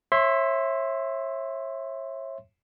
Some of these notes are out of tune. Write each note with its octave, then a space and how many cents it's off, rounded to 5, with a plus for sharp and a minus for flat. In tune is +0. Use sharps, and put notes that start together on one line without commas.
C#5 -35 E5 +0 C6 +0